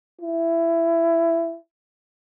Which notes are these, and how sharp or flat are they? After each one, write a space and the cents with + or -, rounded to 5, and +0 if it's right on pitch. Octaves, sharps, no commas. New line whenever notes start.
E4 +15